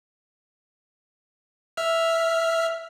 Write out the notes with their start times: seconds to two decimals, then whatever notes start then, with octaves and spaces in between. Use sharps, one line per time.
1.77 E5 F6